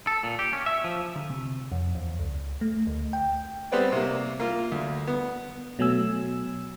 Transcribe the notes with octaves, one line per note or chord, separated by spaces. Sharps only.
A4
A#2
G4
C#4
E5
F3
D3
C3
F2
E2
C#2
A3
D2
G5
G3 B3 C4 B4 C5 D5
C3 A#3
A#3 F4
D2
B3
B2 F#3 A3 G#5 E6